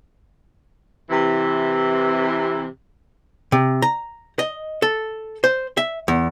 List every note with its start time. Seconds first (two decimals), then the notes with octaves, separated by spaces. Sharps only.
1.10 C3 E3
3.52 C3
3.82 A#5
4.39 D#5
4.82 A4
5.44 C5
5.77 E5
6.08 E2